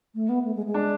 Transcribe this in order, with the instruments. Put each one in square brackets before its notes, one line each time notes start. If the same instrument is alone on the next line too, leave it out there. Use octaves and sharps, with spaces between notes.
[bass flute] A3
B3
A3
G#3
G#3
[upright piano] D4